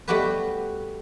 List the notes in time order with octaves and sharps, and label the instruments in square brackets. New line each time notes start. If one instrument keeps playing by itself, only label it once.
[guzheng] G3 A3 B3 F#4 G4 B4